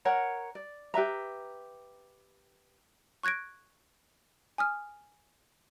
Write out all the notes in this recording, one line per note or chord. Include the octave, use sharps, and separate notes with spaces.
A#4 C#5 F#5 A#5
D5
G4 B4 E5 A#5
C#6 F#6 G#6 A#6 D7
G#5 D#6 F6